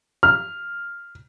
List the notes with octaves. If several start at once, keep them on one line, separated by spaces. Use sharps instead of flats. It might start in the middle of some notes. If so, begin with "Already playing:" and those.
F6